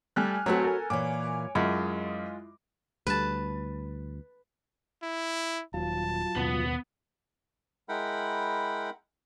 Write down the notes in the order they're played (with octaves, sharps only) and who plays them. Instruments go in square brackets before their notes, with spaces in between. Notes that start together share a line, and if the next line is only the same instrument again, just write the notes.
[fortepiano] G3 A3 [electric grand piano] G#5 F6 F#6
[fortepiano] F#3 A3 C4 [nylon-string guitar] F#4 B4 C#5
[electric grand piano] A4 G#5 [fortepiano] A#4
[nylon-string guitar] A#2 E3 [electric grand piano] C#5 G#5 D6
[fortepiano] F#2 [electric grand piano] G#3 F4 D#5 [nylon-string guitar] E4
[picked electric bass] D2 G3 [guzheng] B4 A5
[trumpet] E4
[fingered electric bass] D#1 [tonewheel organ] F#3 F4 [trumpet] A5
[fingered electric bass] D#2 B2 [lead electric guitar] B3
[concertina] G#3 E4 A#4 F#5 G5 B5